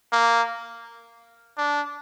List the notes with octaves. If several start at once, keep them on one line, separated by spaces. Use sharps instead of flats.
A#3
D4